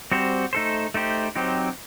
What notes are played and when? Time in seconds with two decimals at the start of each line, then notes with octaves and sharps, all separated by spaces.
0.12 G3 C4 F#4 C5
0.53 A3 D#4 A4 C5
0.94 A3 D#4 G4 C5
1.35 F#3 C4 D#4 G4 C5